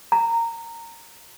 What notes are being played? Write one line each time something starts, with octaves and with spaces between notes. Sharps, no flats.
A#5